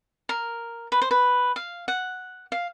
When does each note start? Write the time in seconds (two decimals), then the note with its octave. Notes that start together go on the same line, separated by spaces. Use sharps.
0.29 A#4
0.92 B4
1.02 C5
1.11 B4
1.56 F5
1.88 F#5
2.52 F5